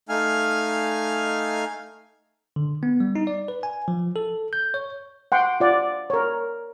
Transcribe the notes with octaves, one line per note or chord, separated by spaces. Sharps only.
A3 D#4 F5 G#5 F6
D3
B3
G3
D#4
D5
B4
G#5
F3
A4
G6
C#5
F#5 G5 C6
F4 D5 F#5
A#4 C#5